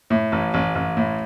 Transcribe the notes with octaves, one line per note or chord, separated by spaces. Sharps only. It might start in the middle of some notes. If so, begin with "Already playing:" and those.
A2
A1
A1
A1
A2